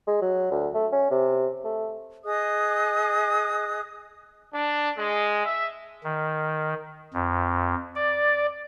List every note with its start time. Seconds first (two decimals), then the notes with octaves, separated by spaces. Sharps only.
0.07 G#3
0.22 F#3
0.51 D2
0.74 A3
0.92 C#4
1.11 C3
1.64 A3
2.25 G#4 D#5 D#6 F#6
4.53 D4
4.98 G#3
5.45 E5
6.04 D#3
7.14 F2
7.95 D5